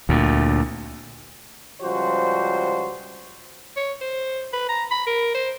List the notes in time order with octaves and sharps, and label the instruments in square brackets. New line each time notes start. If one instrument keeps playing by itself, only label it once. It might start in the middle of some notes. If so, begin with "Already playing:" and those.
[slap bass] D2 A#2
[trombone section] C#2 F3 G3 F#4 C5
[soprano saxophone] C#5
C5
B4
A#5
B5
A#4
C5